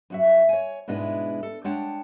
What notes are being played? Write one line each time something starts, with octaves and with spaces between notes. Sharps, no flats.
F#2 F#4 E5
C#5 G#5
G#2 B2 G#3 D4 E4 B4
A4
G#3 D4 C#5 F#5 G5 A5